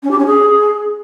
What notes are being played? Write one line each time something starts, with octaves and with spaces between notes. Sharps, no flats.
C#4
G4
C#4
G#4